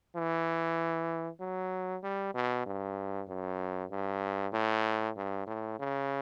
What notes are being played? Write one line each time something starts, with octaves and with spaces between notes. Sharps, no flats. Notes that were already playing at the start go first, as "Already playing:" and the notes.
E3
F#3
G3
B2
G2
F#2
G2
A2
G2
A2
C#3